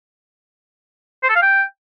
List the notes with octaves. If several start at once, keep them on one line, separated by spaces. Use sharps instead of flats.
C5
A4
F5
G5